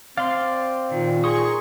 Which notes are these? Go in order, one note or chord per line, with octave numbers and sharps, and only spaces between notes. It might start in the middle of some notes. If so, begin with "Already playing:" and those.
C4 D5 F5 C6
A#2 D#3
G#4 A#4 C6 C#6 D#6